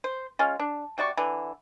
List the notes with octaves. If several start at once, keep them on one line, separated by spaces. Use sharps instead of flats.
C5
G#3 C#4 F4
D4
C3 F#4 D5 C#6
D3 E3 D5